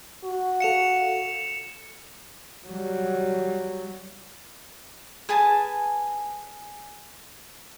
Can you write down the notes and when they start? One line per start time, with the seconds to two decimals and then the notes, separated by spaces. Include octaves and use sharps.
0.24 F#4
0.60 A4 F5 C#7 E7 F7
2.67 F#3 G3
5.29 G#4 B4 G#5 A5